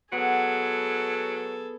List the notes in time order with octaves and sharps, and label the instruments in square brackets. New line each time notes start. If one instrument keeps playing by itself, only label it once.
[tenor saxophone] F#3 [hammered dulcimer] B3 [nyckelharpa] G#4 A4